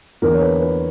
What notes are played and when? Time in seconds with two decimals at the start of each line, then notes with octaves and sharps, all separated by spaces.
0.22 E2 D3 A#3 A#4
0.34 C#5
0.42 B4
0.61 B4